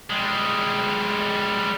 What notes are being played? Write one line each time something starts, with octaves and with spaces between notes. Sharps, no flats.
G3 G#3